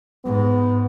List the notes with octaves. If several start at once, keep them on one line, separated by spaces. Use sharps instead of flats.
G#2 B3